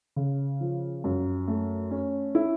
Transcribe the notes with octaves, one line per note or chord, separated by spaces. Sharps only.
C#3
F3
F#2
A3
C#4
E4